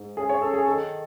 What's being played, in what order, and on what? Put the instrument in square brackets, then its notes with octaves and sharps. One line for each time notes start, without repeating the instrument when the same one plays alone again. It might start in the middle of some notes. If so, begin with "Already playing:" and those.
Already playing: [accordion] G#2
[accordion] C#4 [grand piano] G#4
[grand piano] C#5
[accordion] C#4 [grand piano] A4
[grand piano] G#4
[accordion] D#3 [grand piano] A4